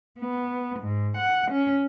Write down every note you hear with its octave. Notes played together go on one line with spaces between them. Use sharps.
B3
G#2
F#5
C#4